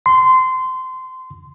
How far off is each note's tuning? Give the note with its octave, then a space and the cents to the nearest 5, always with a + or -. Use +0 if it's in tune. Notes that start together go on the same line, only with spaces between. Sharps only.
C6 -20